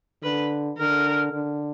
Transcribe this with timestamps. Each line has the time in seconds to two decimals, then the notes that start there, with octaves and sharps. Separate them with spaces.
0.23 D3 B4
0.77 D3 A#4
1.33 D3